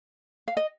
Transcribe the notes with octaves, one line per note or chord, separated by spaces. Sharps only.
F5
D#5